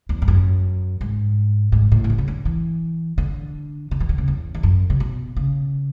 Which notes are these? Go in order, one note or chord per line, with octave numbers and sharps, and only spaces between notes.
E2
G#2
F#2
G#2
G#2
A2
C#3
D3
C#3
D3
E3
D3
D3
E3
D3
C#3
E2
E2
F#2
C#3
B2
C#3